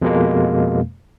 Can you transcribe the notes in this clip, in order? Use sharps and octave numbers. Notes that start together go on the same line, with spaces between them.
F2 B2 G#3 A#3